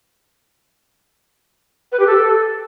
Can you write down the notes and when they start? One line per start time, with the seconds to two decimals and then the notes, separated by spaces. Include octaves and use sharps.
1.92 B4
1.99 G4
2.07 A4